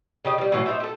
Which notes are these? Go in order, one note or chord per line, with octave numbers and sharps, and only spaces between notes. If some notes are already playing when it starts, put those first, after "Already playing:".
C#3 G4 D#5
F3 G3
A2 E3 F#3 A#3
D#4 F#4 C5 E5
G4 A4